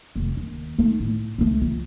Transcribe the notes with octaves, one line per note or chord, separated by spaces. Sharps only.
F1
D#2
A3 D#4
A2
C#2 A3
F3